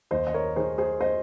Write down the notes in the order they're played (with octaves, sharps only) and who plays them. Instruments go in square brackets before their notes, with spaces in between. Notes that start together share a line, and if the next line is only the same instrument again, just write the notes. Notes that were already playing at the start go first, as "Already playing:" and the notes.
[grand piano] D#2 C5 D#5
D#5
A#4 C#5
D#3 G#4 C5
G#4 C5
C5 D#5